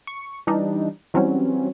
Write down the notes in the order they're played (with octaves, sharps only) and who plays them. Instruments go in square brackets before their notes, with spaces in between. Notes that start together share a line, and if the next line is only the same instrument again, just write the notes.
[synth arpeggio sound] C#6
E3 G3 D4 D#4
E3 F#3 G3 C4 C#4